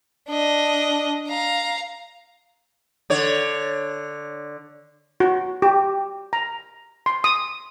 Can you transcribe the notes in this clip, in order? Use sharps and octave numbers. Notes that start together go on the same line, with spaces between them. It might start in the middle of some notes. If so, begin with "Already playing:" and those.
D4 D#5
F5 A#5
D3 C#5
F#4
G4
A#5
C6
D#6